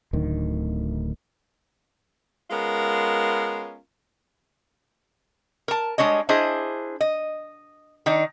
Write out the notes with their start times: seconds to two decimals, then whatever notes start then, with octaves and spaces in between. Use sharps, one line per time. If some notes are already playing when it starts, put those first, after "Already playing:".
0.13 D1 D2 D#3
2.51 G#3 B3 C#4 F4 A#4
5.68 A#4 A5
5.98 G3 G#3 D4 C#5 D#5
6.29 D4 E4 G#4 C5 D#5
7.00 D#5
8.06 D#3 D4 D#4